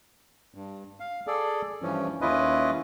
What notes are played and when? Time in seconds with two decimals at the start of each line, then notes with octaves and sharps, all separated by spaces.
0.54 G2
1.00 F5
1.27 G#4 A4 D5
1.82 G2 E3 F3 C#4
2.21 D#2 C#4 E4 F4 B4 D#5